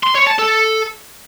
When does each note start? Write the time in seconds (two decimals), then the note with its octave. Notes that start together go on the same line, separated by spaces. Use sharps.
0.03 C6
0.15 C#5
0.27 A5
0.38 A4